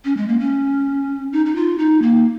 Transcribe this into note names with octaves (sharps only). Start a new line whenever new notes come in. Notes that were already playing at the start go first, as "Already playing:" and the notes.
C#4
G#3
A#3
C#4
D#4
D#4
F4
D#4
A#3